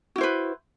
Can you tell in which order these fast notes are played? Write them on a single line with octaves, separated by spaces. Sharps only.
F#4 E4 C5 B4